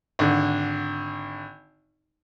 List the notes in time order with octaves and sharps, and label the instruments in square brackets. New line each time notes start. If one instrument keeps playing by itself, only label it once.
[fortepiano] G#1 D3